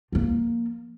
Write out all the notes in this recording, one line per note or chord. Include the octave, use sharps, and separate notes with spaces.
F3 A#3